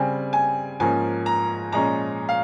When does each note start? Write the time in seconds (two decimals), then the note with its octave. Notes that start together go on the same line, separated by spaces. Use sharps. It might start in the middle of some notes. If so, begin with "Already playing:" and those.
Already playing: C#3 G3 C4 G#5
0.33 G#5
0.80 G#2 F3 A#3 C#4 G#5
1.26 A#5
1.72 A#2 F3 G#3 C#4 A#5
2.29 F5